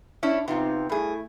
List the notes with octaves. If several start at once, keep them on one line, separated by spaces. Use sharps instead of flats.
C#4 D4 E4
C3 F3 B3 C4 D#4 F4
G2 A3 E4 G#4